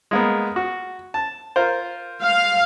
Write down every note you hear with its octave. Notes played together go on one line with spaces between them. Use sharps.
G#3 A#3 B3
F#4
A5
F4 A#4 C5
F5